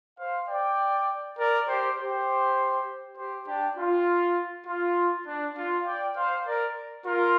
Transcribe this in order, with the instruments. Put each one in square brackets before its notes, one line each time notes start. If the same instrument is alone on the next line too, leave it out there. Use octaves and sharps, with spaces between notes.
[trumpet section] C5 F5
D5 G5
A#4 D5
G4 C5
G4 C5
G4 C5
D4 G4
F4
F4
D4
F4
D5 G5
C5 F5
A#4 D5
F4 A#4